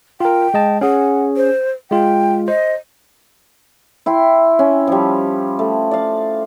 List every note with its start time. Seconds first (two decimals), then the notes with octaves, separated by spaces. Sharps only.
0.20 F4 A#4 G5
0.54 G#3 D#5 A5
0.81 C#4 G#4 F#5
1.37 C5
1.91 G#3 F4 G5
2.48 C5 D#5
4.06 E4 G5 C6
4.59 C#4
4.87 F3 G3
5.59 A3
5.91 D5 F5